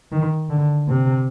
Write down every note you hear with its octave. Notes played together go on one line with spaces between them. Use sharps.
D#3
D3
C3